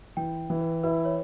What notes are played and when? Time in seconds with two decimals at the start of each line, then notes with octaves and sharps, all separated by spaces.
0.17 E3 G5
0.50 E3
0.61 B4
0.84 E4 B4
1.05 C#5